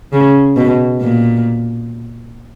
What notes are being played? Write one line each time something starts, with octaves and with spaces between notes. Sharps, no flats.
C#3
B2
A#2